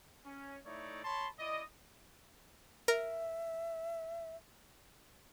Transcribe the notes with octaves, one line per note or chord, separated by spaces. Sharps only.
C#4
A3 D#4 E4 C#5 D5
C#5 A5 B5 C6
E4 D5 D#5
A#4 E5